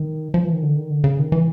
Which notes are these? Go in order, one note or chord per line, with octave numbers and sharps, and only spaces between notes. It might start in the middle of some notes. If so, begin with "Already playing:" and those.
Already playing: D#3
F3
E3
D#3
D3
D#3
D3
C#3
D#3
E3